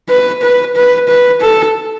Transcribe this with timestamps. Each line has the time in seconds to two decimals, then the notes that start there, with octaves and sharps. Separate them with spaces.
0.09 B4
0.42 B4
0.76 B4
1.08 B4
1.41 A4